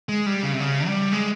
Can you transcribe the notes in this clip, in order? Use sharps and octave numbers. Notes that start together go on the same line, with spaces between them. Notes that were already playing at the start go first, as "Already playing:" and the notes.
G#3
G3
C#3
C3
C#3
G3
G#3